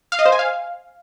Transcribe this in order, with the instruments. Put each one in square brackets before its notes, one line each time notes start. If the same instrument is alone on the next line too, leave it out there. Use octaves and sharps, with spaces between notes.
[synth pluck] F5
D#5
C5
G#5
F5